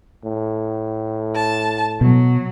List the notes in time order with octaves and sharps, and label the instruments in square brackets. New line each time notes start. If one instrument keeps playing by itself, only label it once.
[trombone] A2
[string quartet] A5
[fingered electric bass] B2 [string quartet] F#3